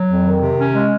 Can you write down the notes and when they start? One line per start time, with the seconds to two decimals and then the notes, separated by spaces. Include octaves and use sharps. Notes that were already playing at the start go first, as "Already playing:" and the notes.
Already playing: F#3
0.08 F2
0.25 D#3
0.41 C3
0.58 C#4
0.74 G#3